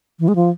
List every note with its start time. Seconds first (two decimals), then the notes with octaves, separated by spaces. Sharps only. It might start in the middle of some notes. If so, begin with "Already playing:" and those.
0.20 E3
0.28 G#3
0.36 F3